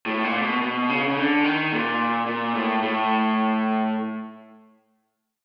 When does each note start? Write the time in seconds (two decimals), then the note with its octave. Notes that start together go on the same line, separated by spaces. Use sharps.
0.06 A2
0.24 A#2
0.42 B2
0.62 B2
0.89 C#3
1.07 C#3
1.16 D3
1.44 D#3
1.72 A#2
2.26 A#2
2.55 A2
2.82 A2